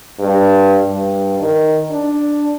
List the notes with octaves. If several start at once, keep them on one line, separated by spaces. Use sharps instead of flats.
G2
G2
D#3
D4